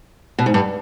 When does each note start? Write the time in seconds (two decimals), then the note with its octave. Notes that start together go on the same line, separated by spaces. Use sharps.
0.39 B2
0.46 G#2
0.54 G2